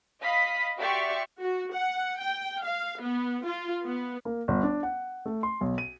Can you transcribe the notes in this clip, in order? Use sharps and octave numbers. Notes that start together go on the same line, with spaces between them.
D#5 F5 B5 D#6 B6
F#4 G4 D5 E5 C6 C#6
F#4
F#5
G5
F5
B3
F4
B3
A#3
G1
D4
F#5
A3
C6
B1
D#7